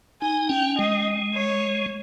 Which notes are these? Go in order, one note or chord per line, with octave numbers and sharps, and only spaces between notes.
D#4 G#5
C#4 G5
G#3 D#5
C#5